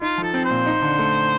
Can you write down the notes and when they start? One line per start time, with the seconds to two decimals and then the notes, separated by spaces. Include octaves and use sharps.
0.01 D#4 F4
0.18 F3
0.23 A4
0.34 C4
0.45 C5
0.50 A#2
0.66 D#4
0.82 D3
0.99 A3